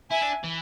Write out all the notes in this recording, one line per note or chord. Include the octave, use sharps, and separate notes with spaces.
E4 E5 G#5
D4
E3